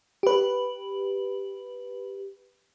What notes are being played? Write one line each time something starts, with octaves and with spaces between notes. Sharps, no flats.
G4 B4